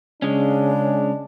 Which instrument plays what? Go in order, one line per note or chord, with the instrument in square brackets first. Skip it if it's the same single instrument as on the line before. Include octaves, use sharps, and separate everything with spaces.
[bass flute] C#3 [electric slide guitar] G#3 C#4 [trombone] D4